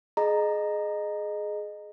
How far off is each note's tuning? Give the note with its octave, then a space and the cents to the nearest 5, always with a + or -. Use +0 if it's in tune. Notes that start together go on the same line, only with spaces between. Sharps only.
G#4 +20 D#5 -20 A#5 +0